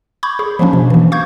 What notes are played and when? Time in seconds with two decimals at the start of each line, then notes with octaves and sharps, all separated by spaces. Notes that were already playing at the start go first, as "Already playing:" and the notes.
0.23 B5 C#6 D6 G6 G#6
0.39 G#4
0.59 F3 F#3 A#3 C#4 D4
0.73 B2
0.90 E3 A#3
1.12 F5 C#6 D6 G6 G#6